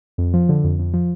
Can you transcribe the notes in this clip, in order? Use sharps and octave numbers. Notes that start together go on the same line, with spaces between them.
F2
F3
D3
F2
F2
F3